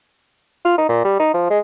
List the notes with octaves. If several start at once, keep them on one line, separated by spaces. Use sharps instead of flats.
F4
D#4
A#2
G3
D#4
F3
G#3